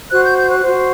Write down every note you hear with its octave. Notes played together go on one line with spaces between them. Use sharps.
F#4 C5 F#6
G6
G6
F#6
F#4 C5